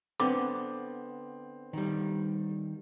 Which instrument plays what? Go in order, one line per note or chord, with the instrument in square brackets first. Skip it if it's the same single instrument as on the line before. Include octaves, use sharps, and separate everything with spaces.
[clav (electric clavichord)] D3 B3 [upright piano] C4 [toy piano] D6
[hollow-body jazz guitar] D#3 G3